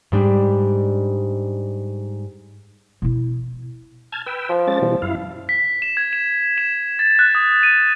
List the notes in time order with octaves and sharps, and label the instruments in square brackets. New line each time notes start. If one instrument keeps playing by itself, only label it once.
[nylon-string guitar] G#2 G3 D4
[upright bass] B2 E4
[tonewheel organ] A5 F6 G#6
B4 G5 E6
[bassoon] F3
[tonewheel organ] G#3 C#4 A6
B2 E3 G3
F#2 E4 F5
[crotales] B6
E7
G#6
E7
E7
A6
F#6
D#6
D#7